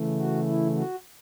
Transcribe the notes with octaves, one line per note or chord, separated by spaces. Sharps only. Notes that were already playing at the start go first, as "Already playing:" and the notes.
Already playing: C#3 E3 A3
F#4
E4
F#4